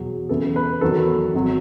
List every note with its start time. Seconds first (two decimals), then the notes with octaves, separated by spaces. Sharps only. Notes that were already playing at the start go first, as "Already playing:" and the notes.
Already playing: E2 B2 F#3 G#4
0.29 E2 C#3 E3 A4
0.56 B4
0.81 E2 D#3 F#3 A4
1.34 G#1 F#3